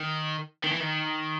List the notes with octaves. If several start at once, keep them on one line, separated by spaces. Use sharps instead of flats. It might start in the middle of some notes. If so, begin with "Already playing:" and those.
Already playing: D#3
D#3
E3
D#3